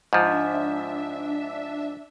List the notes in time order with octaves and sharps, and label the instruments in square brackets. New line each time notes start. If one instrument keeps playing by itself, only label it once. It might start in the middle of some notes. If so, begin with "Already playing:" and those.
[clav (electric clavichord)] G#2 F3 [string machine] D4 E5